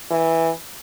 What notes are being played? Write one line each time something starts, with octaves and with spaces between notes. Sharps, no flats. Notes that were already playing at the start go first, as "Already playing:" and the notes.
E3